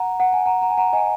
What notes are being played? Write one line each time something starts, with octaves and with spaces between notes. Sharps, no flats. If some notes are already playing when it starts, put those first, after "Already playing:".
Already playing: F#5 A#5
F#5
G#5
F#5 A#5
F#5 A#5
G#5
F#5 A#5
D#5 G#5